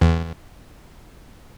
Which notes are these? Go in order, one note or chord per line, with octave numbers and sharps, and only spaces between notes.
E2